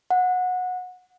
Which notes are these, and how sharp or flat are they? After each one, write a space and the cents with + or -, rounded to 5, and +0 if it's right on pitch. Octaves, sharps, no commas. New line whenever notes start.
F#5 -20